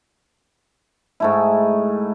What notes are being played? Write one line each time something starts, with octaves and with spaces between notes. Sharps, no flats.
G#2 A3 E4